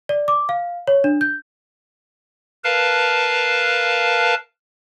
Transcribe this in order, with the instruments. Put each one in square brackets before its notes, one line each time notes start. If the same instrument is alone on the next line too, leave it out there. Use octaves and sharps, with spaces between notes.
[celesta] D5
D6
F5
C#5
D4
G6
[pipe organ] A#4 B4 F5 A5